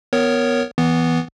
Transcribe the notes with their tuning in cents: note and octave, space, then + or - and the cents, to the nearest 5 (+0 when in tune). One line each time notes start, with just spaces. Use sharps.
B3 +0 A#4 +0 C#5 +0
E3 -15 B3 +0